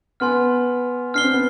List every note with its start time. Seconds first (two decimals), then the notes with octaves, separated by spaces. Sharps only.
0.20 B3 G#5 C6 F6
1.14 D4 F6 C7 G7
1.24 C4
1.33 B3